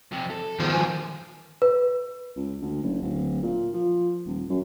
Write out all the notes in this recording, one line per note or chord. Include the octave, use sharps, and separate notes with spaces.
F2 C3
A4
D#3 F3 B3 G#4 C5
G#5
B4
C#2
D2
F#1
D1
A#2
F3
D#1
F#2